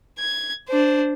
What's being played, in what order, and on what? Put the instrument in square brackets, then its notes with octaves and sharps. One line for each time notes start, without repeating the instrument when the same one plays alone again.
[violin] G#6
D4 C5